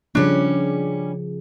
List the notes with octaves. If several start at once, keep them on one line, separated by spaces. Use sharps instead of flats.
C#3 F3 G3 C#4 D4